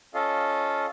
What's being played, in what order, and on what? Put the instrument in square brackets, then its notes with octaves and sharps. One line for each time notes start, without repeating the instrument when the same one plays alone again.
[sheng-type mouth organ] C#4 F4 A4 D#5 F5